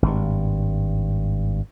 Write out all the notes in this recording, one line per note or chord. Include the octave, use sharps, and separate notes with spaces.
G#1 G2